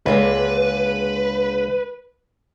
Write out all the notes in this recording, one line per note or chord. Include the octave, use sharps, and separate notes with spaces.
C#2 D3 G#3 A#3 B4